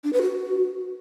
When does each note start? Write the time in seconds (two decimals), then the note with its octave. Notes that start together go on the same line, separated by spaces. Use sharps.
0.04 D4
0.13 B4
0.22 F#4